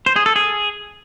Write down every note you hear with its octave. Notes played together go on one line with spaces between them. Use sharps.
C5
G#4
A4
G#4